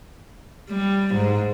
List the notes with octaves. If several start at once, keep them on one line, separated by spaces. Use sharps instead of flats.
G3
G#2